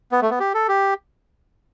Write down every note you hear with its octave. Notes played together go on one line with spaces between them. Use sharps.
B3
A3
B3
G4
A4
G4